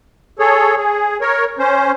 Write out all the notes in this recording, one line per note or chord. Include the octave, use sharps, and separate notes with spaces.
G#4 A4 C#5
G#4
A#4 C#5
C#4 C5